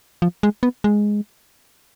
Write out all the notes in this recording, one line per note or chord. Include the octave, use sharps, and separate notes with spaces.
F3
G#3
B3
G#3